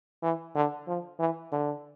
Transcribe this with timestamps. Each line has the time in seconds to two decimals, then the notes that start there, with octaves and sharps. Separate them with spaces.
0.23 E3
0.55 D3
0.88 F3
1.20 E3
1.52 D3